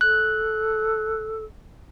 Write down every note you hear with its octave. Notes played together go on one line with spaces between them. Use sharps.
A4 F#6